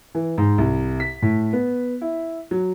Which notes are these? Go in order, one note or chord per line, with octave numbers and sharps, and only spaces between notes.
E3
G#2
C2
B6
A2
B3
E4
F#3